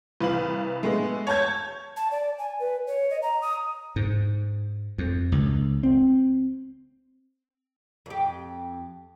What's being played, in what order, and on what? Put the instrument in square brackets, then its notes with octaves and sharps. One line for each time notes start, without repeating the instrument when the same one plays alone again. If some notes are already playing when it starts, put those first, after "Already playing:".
[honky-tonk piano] C2 B4 F5 F#7
G#3 A3 B3
C#5 A5 G6 G#6
[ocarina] A5
D5
G#5
B4
C#5
D#5
A#5
D#6
[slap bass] G#2
F2
C#2
C4
[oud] F2 G4